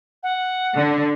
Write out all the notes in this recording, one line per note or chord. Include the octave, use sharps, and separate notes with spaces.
F#5
D3